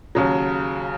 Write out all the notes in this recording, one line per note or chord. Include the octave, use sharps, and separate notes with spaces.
D#2 C#3 F#3